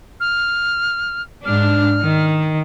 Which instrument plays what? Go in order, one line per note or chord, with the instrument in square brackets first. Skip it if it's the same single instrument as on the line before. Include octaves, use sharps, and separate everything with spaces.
[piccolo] F6
[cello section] G#2 D4 [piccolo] F6
[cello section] D#3